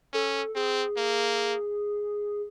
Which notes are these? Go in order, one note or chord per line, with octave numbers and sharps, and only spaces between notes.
C#4 A4
C4 G#4
A#3